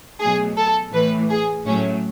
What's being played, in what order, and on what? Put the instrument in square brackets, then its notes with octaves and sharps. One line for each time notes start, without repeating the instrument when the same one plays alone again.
[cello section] B2 F#3 A3 [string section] G#4
[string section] A4
[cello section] A2 E3 A3 [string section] B4
[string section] G#4
[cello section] A2 F#3 A3 [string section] C#4